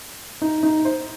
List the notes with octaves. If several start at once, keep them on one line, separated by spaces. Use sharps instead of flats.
D#4
D#4
C5